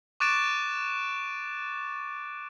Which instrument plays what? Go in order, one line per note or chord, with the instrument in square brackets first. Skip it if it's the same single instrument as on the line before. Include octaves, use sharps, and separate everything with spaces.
[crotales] C#6 D6 F#6 A6 D7 E7